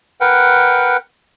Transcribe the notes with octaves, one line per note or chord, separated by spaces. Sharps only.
A#4 B4 F#5 G5